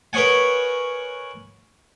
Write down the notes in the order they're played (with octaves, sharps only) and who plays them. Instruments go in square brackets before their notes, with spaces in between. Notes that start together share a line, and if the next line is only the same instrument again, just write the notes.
[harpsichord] A#4 B4 C#5 D#5 F#5 G#5